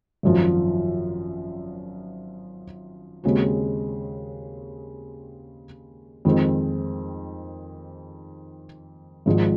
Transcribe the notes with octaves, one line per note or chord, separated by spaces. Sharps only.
G#1 F#2 F3
D#2 C#3 G#3 C4 F#4
F2 D#3 G#3 C4
G#1 G#2 F3